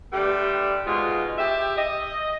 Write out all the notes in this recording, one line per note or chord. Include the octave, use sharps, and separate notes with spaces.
D3 G3 A3 G4 B4
G#2 B2 G#3 F4
G4 E5
D#5